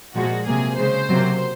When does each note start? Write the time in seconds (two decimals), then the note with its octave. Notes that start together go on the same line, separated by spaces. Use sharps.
0.15 A#2 F3 G#3 F#4
0.46 C3 F#3 A#3 G#4
0.77 C#3 G#3 C5
1.09 C3 F#3 A#3